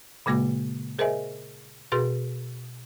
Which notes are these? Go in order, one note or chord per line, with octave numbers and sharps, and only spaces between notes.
A#2 C#3 G#3 A#3 F#4 D6
G#4 A#4 C5 D#5 E5 G#5
B2 F#4 G#4 B4 A6